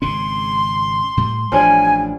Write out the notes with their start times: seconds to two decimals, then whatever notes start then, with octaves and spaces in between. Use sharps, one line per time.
0.02 G#1 C#3 C#4 C6
1.17 A2 G3
1.52 A1 F3 G3 C#4 D4 G#5